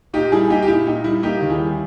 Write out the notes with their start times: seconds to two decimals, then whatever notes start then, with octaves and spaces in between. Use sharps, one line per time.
0.14 A#2 D#4 G4
0.32 G3 E4 G#4
0.50 A#2 D#4 G4
0.62 G4
0.68 A#2 E4
0.86 A#2 D#4
1.04 G3 E4
1.23 A#3 D#4 G4
1.41 D#2
1.50 E4 G#4
1.59 G3